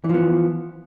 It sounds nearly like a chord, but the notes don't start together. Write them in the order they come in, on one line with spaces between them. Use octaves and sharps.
E3 F3 B3